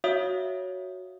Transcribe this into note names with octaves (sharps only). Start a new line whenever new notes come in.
F#4 C#5 E5 F5 D#6